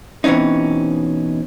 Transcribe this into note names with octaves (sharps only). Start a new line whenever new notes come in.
B2 E3 C4 C#4 D#4